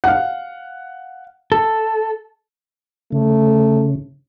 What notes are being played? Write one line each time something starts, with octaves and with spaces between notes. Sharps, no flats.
F5 F#5
A4
C#3 A3